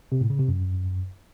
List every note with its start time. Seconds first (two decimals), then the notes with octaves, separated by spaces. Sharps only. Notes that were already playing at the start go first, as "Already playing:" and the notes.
0.12 C3
0.21 A2
0.30 C#3
0.39 C3
0.48 F#2